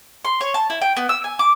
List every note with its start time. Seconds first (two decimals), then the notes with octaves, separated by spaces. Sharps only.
0.25 C6
0.41 C#5
0.54 A5
0.70 E4
0.82 G5
0.97 B3
1.09 E6
1.24 G#5
1.39 D6